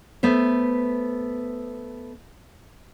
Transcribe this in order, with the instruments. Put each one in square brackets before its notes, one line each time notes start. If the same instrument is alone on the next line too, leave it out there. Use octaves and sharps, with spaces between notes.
[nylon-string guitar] A3 B3 C5 E5